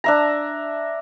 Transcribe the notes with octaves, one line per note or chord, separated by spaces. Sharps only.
D4 E5 A#5